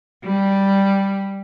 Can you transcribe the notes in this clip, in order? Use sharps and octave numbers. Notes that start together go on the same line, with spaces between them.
G3